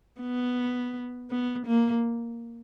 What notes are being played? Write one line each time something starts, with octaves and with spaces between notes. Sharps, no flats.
B3
B3
A#3